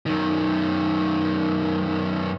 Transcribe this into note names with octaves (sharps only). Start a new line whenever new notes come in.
F#2 D#3